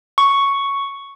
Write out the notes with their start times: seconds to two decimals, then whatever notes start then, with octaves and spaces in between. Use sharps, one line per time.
0.18 C#6